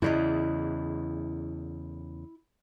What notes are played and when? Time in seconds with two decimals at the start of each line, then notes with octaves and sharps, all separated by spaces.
0.02 E2 C#3 E4 D5 D#5